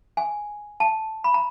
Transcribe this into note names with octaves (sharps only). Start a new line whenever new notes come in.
G#5
A5
B5
A#5